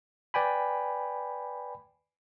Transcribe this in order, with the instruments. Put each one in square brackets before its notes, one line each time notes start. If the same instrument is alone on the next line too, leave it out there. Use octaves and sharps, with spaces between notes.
[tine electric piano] B4 D5 G5 G#5 B5